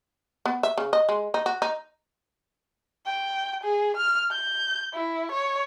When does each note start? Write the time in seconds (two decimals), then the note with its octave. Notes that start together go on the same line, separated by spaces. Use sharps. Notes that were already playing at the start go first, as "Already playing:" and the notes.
0.46 B3
0.63 E5
0.78 C#3
0.93 D#5
1.09 G#3
1.34 D#4
1.46 F#4
1.62 D#4
3.06 G5
3.64 G#4
3.97 F6
4.32 G6
4.94 E4
5.32 C#5